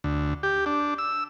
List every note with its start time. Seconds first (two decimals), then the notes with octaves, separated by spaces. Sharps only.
0.04 D2
0.43 G4
0.66 D4
0.98 E6